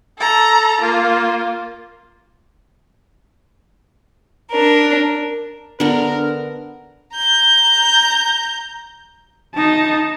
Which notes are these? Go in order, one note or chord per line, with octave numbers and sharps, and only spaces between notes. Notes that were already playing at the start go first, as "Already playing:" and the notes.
A4 A#5
A#3 F4
D4 A#4
D3 B3 D4 A#4
A#5 G6
D#4 A5